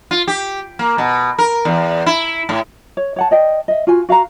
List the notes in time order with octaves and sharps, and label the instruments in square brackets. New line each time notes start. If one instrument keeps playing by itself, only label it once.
[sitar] F4
G4
A#3
B2
A#4
E2
E4
A2
[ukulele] C#5
C#5 F#5 A5
D5 D#5 G5
D#5 E5
F4 F#4 G#5
F#4 F5 F#5 A#5